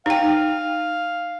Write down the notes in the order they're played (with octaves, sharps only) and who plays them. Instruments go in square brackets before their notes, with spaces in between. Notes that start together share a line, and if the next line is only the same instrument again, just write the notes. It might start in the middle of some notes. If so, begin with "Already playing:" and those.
[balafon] D#4 G5 [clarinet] F5